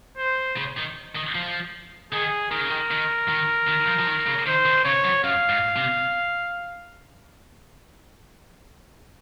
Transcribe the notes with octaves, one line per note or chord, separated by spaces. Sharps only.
C5
C#3
D#3
D#3
F3
D#3 G#4
D#3 A#4
C#3
D#3
D#3
D#3
D#3
F3
F3
D#3
C#3
D#3 C5
D#3
C#3 C#5
F#2
F#2 F5
G#2
C3